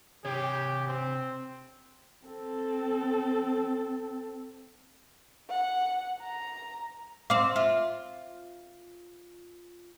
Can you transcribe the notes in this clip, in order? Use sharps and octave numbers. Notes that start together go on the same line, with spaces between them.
C3 G4 C#5
C4
C4 A4
F#5
A#5
C4 F5 D6
F4 E5